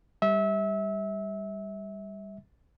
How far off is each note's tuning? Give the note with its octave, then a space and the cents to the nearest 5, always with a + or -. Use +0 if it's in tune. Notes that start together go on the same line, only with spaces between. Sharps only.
G3 +15 E5 -25